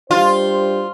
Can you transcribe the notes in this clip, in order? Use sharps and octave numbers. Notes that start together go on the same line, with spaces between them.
G3 D4 F4 C5